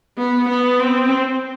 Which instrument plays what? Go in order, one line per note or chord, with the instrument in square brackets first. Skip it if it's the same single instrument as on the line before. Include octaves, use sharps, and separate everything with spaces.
[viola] B3
B3
C4